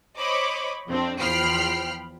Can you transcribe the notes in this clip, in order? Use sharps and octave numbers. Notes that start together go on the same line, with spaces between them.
C5 C#5 D#5 B5 C#6 D6
F2 C4 D4
E2 F3 G5 B5 F6 C7